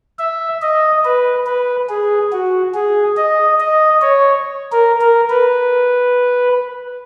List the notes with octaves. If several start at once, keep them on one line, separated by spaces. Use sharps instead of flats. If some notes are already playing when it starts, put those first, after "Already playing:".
E5
D#5
B4
B4
G#4
F#4
G#4
D#5
D#5
C#5
A#4
A#4
B4